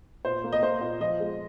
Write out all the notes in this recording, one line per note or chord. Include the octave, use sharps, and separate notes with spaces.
A#2 C5
A#3
D#5
A#3 C5
A#2
F3 D#5
G#3